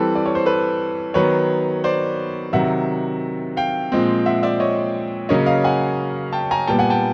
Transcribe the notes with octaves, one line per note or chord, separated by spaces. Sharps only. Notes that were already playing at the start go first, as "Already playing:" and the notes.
Already playing: E3 G3 C4 A4 B4
D5
C#5
C5
A4 B4
D#3 F#3 B3 B4 C#5
C5 D5
C3 D#3 F#3 E5 F#5
F5 G5
A#2 F3 G#3 C4
E5 F#5
D5 E5
C#5 D#5
C#3 F#3 A#3 C#4 C#5 D#5
D#5 F5
F#5 G#5
G5 A5
G#5 A#5
A#2 G3 B3 G5 A5
F#5 G#5
G5 A5